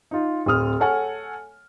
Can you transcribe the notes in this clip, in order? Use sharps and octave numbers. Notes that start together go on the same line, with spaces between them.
D#4 F4
D1 C4 D#6 F6
A4 C#5 F#5 G#5